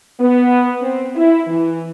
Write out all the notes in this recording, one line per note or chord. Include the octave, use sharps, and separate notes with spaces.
B3
C4
E4
E3